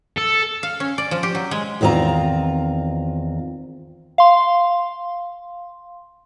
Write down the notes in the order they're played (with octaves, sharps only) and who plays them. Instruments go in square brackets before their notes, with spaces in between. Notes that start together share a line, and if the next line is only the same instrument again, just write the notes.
[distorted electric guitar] A4
[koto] F5
C#4
D5
F3
G4
F#3
G#3
[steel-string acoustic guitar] E2 D#3 C4 F4 A#5
[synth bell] F5 C6